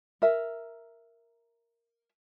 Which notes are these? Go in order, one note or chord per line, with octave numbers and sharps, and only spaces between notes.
A#4 E5